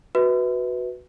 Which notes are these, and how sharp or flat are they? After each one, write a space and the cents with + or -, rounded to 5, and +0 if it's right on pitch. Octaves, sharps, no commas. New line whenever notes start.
F#4 +0 B4 +0 E5 -40